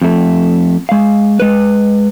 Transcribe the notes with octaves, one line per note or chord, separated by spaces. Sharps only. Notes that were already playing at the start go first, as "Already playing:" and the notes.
F2 A3
G#3 F5
G#3 B4